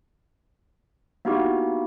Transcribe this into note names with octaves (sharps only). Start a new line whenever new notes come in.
A#3 B3 D#4 E4 F#4 G4